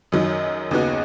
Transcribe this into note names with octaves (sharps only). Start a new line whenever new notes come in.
F#2 D#3 F#3 D#4
D#2 C#3 B3 D#4 F#4